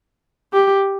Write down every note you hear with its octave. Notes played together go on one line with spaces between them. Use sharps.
G4